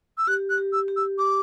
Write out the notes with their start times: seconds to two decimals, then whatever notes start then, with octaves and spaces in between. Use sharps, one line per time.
0.18 E6
0.27 G4 F#6
0.50 F#6
0.58 G4
0.73 E6
0.88 G4
0.96 E6
1.18 G4 D6